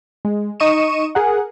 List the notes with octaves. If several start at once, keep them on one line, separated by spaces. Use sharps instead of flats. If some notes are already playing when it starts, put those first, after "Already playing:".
G#3
D#4 D#5 C#6 C#7 D#7 E7
G#4 A#4 F#5